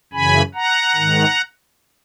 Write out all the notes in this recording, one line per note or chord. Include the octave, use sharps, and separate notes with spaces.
F#2 C#3 E3 G#5 B5
F#5 A#5
G#2 D#3